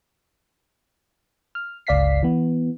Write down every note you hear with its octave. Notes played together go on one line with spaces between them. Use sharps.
F6
G1 C#2 D5 F5 B6 C7
E3 B3